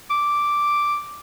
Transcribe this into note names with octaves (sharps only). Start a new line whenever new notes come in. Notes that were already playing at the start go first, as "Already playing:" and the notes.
D6